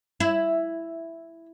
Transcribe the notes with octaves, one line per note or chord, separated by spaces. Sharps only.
E4